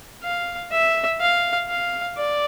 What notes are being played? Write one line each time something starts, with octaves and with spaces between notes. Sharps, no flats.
F5
E5
F5
F5
D5